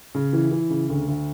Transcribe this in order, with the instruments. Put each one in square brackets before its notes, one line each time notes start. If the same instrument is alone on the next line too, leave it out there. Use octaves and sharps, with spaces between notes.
[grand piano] C#3
E3
E3
C#3
D2
D2